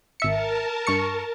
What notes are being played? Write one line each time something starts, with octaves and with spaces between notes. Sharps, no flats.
G#1 A#4 E5 A5 C#7
G2 C#6 C#7